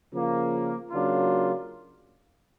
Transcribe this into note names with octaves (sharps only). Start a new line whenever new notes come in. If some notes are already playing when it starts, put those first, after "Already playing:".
C#3 F3 A#3
C#3 F#3 A#3 D4 F4